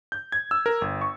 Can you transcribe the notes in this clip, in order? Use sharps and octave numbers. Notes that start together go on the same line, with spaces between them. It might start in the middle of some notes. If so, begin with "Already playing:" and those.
G6
G#6
E6
A#4
G1
C#6